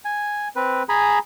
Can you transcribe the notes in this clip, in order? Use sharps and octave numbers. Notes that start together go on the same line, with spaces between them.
G#5
C4 B4
G#4 G#5 A#5 B5